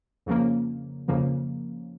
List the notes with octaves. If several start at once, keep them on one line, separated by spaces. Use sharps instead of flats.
F2 C#3 F3 A#3
F2 C#3 F3 A#3